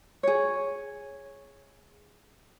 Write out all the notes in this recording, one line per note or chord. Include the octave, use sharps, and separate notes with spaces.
G#4 C#5